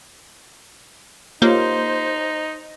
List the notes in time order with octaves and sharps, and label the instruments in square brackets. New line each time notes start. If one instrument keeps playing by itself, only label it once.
[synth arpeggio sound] A#3 [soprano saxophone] D#4 [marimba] F4 G4 C#5 [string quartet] C5